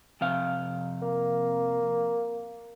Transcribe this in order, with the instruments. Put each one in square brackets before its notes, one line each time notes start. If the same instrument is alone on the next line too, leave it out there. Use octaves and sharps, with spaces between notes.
[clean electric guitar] F2 C3 F5
[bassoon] A#3